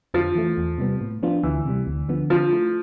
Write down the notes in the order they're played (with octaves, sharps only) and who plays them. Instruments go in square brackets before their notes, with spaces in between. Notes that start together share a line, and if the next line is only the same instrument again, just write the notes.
[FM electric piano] F2 [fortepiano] F3
[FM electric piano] E3 A3
E2
C3 G3 B3
A2
F3 B3 D4 F4
[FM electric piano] D2 [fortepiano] E3
[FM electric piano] C3 G3
D2
D3 F3 B3
[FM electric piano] D3 [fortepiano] F3
[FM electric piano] A3 E4